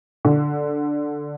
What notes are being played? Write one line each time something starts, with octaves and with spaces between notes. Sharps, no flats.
D3